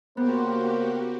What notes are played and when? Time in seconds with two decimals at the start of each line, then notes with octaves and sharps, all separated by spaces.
0.17 C#3 A#3 B3 F#4 G4 A#4 C5